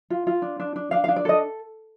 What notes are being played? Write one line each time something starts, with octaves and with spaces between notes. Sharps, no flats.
F4
F4
D4
D4
D4
D4 F5
F5
D4
D5
A4 D#5